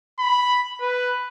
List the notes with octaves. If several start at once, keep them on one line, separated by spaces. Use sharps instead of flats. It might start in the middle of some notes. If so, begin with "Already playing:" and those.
B5
B4